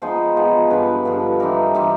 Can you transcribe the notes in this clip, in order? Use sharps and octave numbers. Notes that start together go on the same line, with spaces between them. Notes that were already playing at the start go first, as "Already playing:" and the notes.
F3 G#3 B3 D#4 C5
F3 G#3 B3 D#4
G2 D3 F3 B4
G2 D3 F3
E3 G3 C4 D#4 A#4
E3 G3 C4 D#4